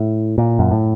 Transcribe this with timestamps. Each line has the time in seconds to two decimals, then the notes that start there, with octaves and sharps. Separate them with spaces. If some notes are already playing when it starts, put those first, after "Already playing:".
Already playing: A2
0.38 A#2
0.59 F#2
0.71 A2